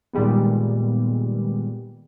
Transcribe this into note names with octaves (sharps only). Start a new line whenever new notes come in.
A#2 D#3 G3 G#3 B3